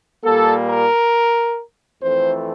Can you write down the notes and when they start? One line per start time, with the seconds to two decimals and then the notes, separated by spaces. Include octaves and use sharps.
0.24 A#2 G3 A#3 A4
0.69 A#4
2.02 F2 E3 A3 C4 C5